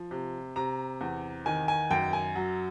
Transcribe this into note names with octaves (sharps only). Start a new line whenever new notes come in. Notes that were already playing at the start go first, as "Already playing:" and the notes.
Already playing: F3
C3
C3 A#5
E2
D#3 G#5
G#5
F#2 G5
G#5
F#3